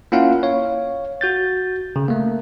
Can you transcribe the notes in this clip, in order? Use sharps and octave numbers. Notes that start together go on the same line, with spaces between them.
A#3 C#4 E4 F4 F5 F#5
C#5 F5
F#4 G6 A6
C#3
A3 A#3